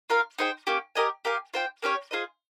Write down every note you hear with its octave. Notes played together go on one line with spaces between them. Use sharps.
F4 A#4 F5
D#4 G#4 C5 G5
A#3 C#4 G4
G4 A#4 D#5 G#5
G4 A#4 F5 G#5
F4 C5 G5
A#3 C#4 G4 C#5
F4 G#4 C5 D#5